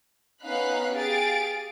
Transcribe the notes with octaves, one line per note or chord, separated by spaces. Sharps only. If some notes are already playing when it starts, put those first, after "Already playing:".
B3 C#4 D#4 F5 B5 F#6
G4 G#4 F5 A6 D7